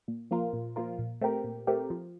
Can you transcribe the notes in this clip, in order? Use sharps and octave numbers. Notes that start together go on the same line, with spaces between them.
A#2
F3 A#3 F4 A#4
A#2
F3 A#3 F4 A#4
A#2
A3 C4 G4 A#4
A#2
A3 C4 G4 A#4
F3